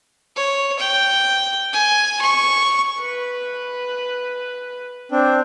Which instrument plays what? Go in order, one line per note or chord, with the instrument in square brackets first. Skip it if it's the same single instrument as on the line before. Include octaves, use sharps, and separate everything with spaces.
[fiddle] C#5
G5
G#5
C#6
[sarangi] B4
[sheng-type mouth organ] C4 D4